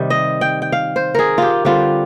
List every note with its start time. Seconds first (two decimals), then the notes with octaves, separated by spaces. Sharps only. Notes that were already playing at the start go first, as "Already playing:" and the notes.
Already playing: C3 D#3 G3
0.10 D#5
0.41 G5
0.62 G5
0.72 F5
0.96 C5
1.15 G#4 A#4
1.38 F4 G4
1.65 D3 G3 C4 F4